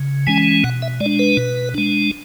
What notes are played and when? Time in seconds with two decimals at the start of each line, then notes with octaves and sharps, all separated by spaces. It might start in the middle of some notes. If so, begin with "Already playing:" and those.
Already playing: C#3
0.27 E3 G#3 C#4 G#5
0.64 B2 F#5
0.82 E5
1.00 G#3 D5
1.06 D4
1.19 B4
1.37 B2
1.75 G#3 D4